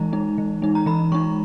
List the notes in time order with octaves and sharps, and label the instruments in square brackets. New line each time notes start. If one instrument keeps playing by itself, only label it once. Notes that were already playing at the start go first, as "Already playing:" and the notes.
Already playing: [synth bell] E3 G#3 D#4 A#5
G#3 D#4
E3
G#3 D#4
A#5
E3 B5
G#3 D#4 C#6